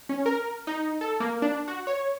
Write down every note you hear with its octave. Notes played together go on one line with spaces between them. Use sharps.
C#4
A#4
D#4
A4
A#3
D4
F#4
C#5